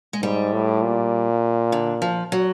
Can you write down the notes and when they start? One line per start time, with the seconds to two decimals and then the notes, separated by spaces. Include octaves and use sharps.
0.13 G#3
0.22 G#2 G3
0.53 A2
0.82 A#2
1.72 D3
2.02 F3
2.32 F#3